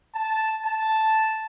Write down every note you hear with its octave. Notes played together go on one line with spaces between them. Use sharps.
A5
A5